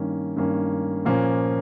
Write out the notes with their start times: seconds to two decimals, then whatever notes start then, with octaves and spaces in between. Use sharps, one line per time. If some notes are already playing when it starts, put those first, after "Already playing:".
Already playing: G2 D#3 A#3 C#4
0.36 G2 D#3 A#3 C#4
1.05 A#2 F3 A#3 C#4